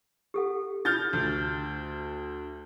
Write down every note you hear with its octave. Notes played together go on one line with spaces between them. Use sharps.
G4 A4 F#5
D4 F4 A4 F6 G6 A6
D2